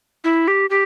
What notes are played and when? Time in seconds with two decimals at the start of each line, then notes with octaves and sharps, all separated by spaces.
0.24 E4
0.48 G4
0.70 G4